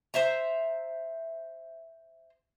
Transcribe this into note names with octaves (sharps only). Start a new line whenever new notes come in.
C5 E5 A#5